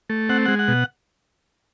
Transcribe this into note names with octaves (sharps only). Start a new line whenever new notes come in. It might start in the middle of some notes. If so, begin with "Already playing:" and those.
A3
C4 F#5
G#3 F#5
F#5
B2